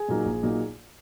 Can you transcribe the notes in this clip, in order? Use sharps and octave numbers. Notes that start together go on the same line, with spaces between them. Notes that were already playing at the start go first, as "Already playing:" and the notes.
Already playing: G#4 G#5
A#2 F#3 A#3 D#4
A#1
A#2 F#3 A#3 D#4